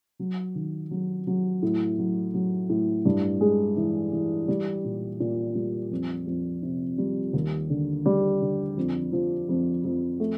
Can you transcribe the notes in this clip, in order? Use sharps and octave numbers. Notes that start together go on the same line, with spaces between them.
F#3
D#3
F#3
F#3
A2
F#3
F#3
A2
G2
G#3
E3
E3
G3
A#2
A#2
G3
F2
F2
C3
G3
D#2
D3
G3
D3
F2
F3
F2
F2
A3